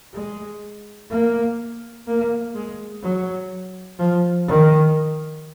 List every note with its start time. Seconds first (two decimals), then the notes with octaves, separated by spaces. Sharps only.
0.13 G#3
1.10 A#3
2.07 A#3
2.55 G#3
3.03 F#3
3.99 F3
4.48 D#3